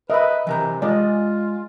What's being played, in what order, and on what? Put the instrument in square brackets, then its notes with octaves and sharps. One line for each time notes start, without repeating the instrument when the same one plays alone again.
[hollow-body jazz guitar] A#4 B5 [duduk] B4 [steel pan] D#5 E5
[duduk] C3 [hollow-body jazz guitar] E3 A#4 A#5
[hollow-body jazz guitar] G#3 [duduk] F4 [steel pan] D5 D#5